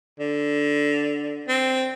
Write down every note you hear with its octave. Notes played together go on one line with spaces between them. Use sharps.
D3
C4